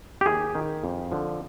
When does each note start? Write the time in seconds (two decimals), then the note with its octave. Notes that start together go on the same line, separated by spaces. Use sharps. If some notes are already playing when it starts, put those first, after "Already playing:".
0.21 G4
0.26 D#2 G#4
0.55 D#3
0.84 F2
1.12 D3 F3